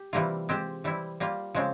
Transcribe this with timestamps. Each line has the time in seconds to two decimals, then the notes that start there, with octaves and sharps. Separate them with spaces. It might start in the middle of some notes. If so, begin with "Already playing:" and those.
Already playing: G4
0.13 C3 E3 G3 A#3 F4
0.49 G#3 C4 G4 C5
0.84 E3 G3 C4 E4
1.20 G3 A#3 F4
1.55 C#3 F3 G#3 C4